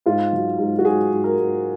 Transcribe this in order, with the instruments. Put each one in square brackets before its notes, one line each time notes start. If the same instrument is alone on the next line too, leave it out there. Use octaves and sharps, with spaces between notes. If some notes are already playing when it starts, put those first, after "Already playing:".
[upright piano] G#2 F4
F#3
G#2
F#4
G#2 G#4
G#2
A#4
G#2